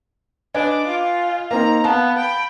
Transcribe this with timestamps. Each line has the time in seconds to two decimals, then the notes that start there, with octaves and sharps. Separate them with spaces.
0.54 D4 B4 D#5 G#5 D6
0.88 F4
1.51 A#3 C4 D#4 A#5
1.84 B3 F5 A5
2.18 G5 B5